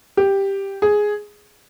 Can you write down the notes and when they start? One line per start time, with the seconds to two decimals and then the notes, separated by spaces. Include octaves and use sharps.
0.17 G4
0.82 G#4